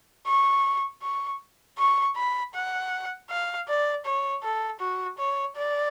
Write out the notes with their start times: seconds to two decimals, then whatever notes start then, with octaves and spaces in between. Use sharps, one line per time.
0.27 C#6
1.02 C#6
1.78 C#6
2.16 B5
2.54 F#5
3.30 F5
3.68 D5
4.05 C#5
4.43 A4
4.80 F#4
5.18 C#5
5.56 D5